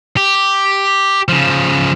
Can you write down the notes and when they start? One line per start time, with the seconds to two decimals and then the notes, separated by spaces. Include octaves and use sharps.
0.17 G4
1.29 C#3 F3